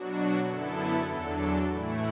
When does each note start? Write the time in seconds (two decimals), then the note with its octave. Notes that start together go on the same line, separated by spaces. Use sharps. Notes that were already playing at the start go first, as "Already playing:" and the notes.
Already playing: B2 F#3 D4 F#4
0.48 F#2 D3 B3 E4 A4
1.08 E2 D3 F#3 D4 A4
1.68 A2 E3 A3 E4